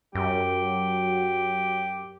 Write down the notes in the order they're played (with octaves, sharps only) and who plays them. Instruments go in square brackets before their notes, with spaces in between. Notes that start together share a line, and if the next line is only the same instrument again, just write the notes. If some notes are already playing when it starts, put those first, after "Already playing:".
[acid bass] F#2 [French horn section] F#3 [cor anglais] G4